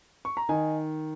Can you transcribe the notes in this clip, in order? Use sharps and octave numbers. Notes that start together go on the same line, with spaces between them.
C#6
A#5
D#3 D#5 G#5